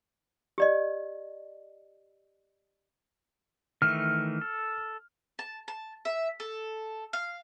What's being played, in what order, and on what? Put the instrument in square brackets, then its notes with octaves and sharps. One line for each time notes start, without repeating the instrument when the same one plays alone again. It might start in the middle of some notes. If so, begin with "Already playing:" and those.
[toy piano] G4 D5 D#5
[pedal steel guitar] D#3 E3 A3 [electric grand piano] F6
[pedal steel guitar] A4
[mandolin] A5
A5
E5
A4
F5